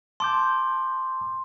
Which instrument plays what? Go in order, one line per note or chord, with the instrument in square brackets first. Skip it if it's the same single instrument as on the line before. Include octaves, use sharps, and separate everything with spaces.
[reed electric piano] A5 D6 G6 [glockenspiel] C6